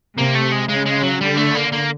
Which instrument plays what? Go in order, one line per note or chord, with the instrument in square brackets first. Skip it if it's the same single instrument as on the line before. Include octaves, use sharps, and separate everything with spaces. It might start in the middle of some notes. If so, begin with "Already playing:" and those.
[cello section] C3 [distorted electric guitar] A#3
[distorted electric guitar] A3
G#3
[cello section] C#3 [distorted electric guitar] G#3
[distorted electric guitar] G#3
F#3
[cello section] D3 [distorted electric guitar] G3
[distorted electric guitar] A3
A#3
A#3